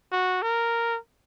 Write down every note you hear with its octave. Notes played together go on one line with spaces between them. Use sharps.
F#4
A#4